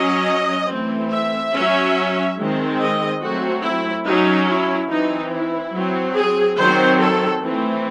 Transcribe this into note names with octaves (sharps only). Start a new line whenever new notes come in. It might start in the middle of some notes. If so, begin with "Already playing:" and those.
Already playing: F#3 C#4 D#5
E3 A3 C4
E5
F#3 C#4
D#3 G#3 C4
D#5
F#3 A3 C4 F#4
E4
F#3 C#4 D#4
E4
E3 C4 D#4
E4
F#3 C4
G#4
D#3 F#3 C4 C5
A4
E3 A3 C4